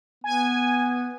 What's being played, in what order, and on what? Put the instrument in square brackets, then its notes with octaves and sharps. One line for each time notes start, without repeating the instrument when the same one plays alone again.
[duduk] B3 [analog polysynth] G#5